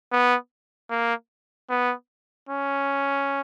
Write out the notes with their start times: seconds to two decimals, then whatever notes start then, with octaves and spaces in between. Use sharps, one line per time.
0.12 B3
0.90 A#3
1.70 B3
2.49 C#4